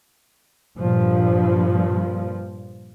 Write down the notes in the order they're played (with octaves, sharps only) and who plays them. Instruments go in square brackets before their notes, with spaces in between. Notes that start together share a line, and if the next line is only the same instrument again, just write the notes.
[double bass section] G2 A#2 F3